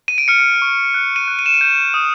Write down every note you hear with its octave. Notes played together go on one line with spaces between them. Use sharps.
D#7
D7
F6 C#7
C#6
F#6
D#7
F#6
D#7
E7
D#7
G6
D#6